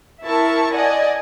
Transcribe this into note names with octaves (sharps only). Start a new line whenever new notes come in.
E4 A#4 E5 A5 C#6
D5 D#5 F#5 G#5